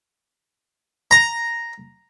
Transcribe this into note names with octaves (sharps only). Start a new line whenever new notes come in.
A#5